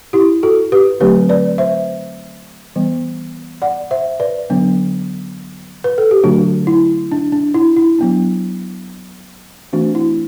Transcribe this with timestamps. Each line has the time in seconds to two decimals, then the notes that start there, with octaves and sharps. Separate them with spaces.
0.13 E4 G4
0.43 F#4 A4
0.72 G4 B4
1.00 D3 F#3 A3 C4 G4 B4
1.29 B4 D5
1.58 C5 E5
2.76 E3 G3 B3
3.62 D5 F#5
3.91 C5 E5
4.20 B4 D5
4.50 D3 F#3 B3 D4
5.84 B4
5.98 A4
6.11 G4
6.24 D3 F#3 A3 D4 F#4
6.67 E4
7.12 D4
7.32 D4
7.54 E4
7.77 E4
7.99 F#3 B3 D4
9.73 E3 A3 C4 D4 F#4
9.95 E4